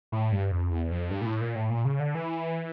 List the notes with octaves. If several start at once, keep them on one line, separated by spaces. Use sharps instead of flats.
A2
G2
F2
E2
F2
G2
A#2
A2
A#2
A2
A#2
C#3
D3
E3